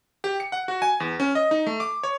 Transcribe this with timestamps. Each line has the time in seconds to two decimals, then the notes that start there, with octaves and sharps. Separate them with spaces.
0.24 G4
0.40 C#7
0.52 F#5
0.68 F#4
0.82 G#5
1.00 E2
1.20 C#4
1.35 D#5
1.51 D#4
1.66 A3
1.80 D6
2.03 C#5